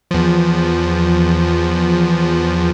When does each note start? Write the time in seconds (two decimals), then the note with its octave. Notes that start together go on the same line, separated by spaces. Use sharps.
0.11 E2 F3